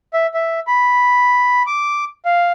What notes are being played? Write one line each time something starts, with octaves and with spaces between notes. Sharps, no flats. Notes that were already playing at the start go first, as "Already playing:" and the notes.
E5
E5
B5
D6
F5